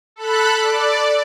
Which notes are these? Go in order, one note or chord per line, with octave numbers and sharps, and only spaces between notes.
A4 B5 F#6
D5